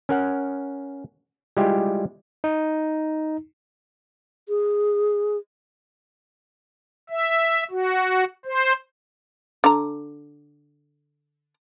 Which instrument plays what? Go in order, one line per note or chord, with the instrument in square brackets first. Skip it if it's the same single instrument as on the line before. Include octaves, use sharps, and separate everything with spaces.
[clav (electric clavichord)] C#4 A#4 F#5
G3 G#3 E4 F4 G4
[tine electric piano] D#4
[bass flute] G#4
[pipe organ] E5
F#4
C5
[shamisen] D3 A#5